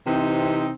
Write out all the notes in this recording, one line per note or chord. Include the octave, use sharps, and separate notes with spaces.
C3 E3 C4 D#4